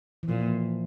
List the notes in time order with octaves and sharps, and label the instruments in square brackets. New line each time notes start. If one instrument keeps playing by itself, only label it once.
[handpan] E3
[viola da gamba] A#2 [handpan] F3